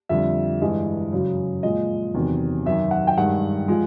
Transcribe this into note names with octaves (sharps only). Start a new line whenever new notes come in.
F2 D3 G3 E5
G2 E3 G#3 D#5
F#2 C#3 F#3
A#2 F3 G#3 D#5
E2 C3 D#3 F#3
F#2 D#3 F#3 E5
F#5
G5
G2 D#3 G#3 F#5
F3 G#3